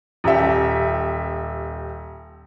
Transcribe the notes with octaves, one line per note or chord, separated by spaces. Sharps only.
D#1 G4 E5